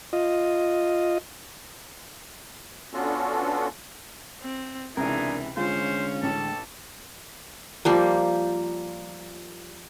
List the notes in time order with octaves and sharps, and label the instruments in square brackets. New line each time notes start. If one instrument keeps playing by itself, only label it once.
[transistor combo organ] F4 D#5
[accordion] B3 C#4 D4 F4 F#4 A4
[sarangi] C4
[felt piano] C#2 C3 [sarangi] E3 [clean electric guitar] D4 A#4 [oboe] G#4
[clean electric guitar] D2 G#3 [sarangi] C#4 [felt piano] F4 [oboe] C5
[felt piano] A1 [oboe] A4
[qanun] F3 G3 A#3